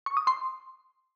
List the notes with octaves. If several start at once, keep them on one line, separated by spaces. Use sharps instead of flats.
C#6
D#6
C6